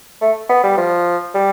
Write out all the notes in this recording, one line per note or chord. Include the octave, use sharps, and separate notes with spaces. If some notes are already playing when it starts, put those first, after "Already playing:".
A3
B3
G3
F3
G3